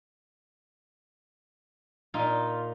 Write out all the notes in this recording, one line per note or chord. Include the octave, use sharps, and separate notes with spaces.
A#2 D#4 F4